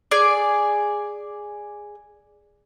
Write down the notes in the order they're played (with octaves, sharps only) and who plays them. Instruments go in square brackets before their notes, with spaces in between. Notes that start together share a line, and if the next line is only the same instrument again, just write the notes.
[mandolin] G#4 D5